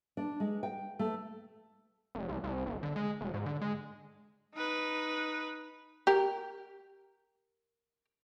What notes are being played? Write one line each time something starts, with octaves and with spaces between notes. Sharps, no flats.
D4
G#3
G5
A3
F1
C2
C2
G1
D3
G#3
E1
G#2
D3
G#3
D#4 B4
G4 A#4